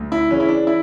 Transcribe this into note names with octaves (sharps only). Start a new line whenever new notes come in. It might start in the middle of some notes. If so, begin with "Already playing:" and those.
Already playing: D2
E4
C#3 E3 C#4
E4
D4
E4